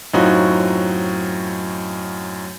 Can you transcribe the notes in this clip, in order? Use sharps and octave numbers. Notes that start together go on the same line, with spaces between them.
F#2 A2 C4 D#4 F4 F#4